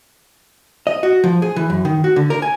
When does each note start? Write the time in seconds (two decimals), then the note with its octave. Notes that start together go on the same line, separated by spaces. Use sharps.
0.87 D#5
1.03 F#4
1.24 F3
1.42 G#4
1.56 E3
1.70 F#2
1.85 D#3
2.04 F#4
2.16 D3
2.30 A#4
2.42 G#5